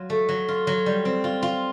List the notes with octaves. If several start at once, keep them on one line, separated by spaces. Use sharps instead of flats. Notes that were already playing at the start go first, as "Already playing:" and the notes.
Already playing: F#3 F4
A3
F#3
F4
F#3
G3
C4
F4
F4